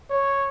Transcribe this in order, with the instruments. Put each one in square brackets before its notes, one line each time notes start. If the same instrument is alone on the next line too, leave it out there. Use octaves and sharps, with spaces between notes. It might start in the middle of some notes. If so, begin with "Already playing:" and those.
[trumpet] C#5